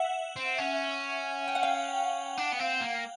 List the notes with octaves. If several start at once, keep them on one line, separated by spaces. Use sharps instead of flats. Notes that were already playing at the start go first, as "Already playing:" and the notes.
Already playing: E5 F#5
C4
C#4
G5
F#5
F5 G5
D4
B3
C4
A#3